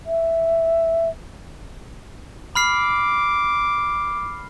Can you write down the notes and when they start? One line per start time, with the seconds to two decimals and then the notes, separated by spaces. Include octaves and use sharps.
0.06 E5
2.55 B5 D6 F6 C7